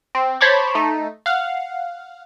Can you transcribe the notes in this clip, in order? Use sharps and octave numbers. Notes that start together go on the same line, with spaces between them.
C4
C5 C#5 A5 B5 C#6 D6
A3 D#4
F5 F#5